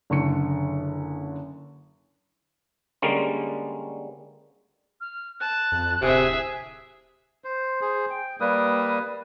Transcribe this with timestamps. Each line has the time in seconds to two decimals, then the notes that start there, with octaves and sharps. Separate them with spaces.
0.10 F#1 D3 C#6 C#7
3.02 D3 G3 G#3 A#3 C#4
5.01 F6
5.40 A5 F#6
5.72 F2
6.02 D1 C3 G#4 E5
7.44 C5
7.81 G#4 C5
8.10 G5
8.40 G3 A#3 B4 D#6